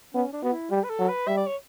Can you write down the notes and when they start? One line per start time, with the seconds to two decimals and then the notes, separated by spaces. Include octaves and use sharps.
0.14 B3 C#4
0.33 D4
0.43 B3 F#4
0.52 E4
0.71 G3 G4
0.84 B4
0.90 A4
0.99 F#3
1.09 B4
1.27 G3 E5
1.37 D5
1.47 C#5